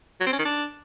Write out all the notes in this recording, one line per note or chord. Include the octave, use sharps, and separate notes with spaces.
F#3
C4
C#4
D#3
D4